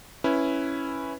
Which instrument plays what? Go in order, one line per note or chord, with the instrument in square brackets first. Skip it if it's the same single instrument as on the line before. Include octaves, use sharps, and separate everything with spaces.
[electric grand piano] C#4 E4 B4